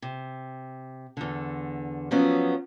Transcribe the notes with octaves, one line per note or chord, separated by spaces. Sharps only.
C3
E2 D3
F3 F#3 B3 C#4